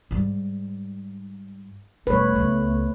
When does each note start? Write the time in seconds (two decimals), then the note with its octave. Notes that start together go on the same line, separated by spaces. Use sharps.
0.11 G#2 G3
2.07 E1 G3 A3 B4 C#5
2.35 C#2 B3